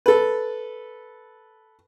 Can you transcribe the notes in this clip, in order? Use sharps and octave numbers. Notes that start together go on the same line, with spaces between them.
A4 B4